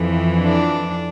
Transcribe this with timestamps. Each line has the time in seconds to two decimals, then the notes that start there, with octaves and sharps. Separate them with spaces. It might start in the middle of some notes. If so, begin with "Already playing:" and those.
Already playing: F2 E3
0.41 D4